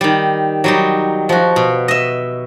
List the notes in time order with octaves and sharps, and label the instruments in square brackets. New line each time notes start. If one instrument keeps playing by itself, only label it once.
[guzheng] D#3 G3
F#3 G3 D#4
F3 F#4
B2
D#5 E5